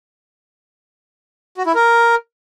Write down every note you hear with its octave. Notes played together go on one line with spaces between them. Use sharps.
F#4
E4
A#4